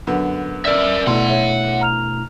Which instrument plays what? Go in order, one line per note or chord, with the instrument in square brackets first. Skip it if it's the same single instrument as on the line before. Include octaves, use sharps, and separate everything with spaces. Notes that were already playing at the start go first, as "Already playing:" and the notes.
[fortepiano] F#2 D3 B3
[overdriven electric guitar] A#4 E5 [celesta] D5 E6
[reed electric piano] B2 A3 E4 [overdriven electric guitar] F#5 C6
[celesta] C#5 E5
A#5 F6 F7